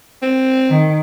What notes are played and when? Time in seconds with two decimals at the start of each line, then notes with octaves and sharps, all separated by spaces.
0.22 C4
0.69 D#3